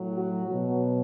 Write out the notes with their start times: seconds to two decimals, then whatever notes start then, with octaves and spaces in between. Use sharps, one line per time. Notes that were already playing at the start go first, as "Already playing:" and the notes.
Already playing: A2 F#3
0.14 F#4
0.47 B2 F#3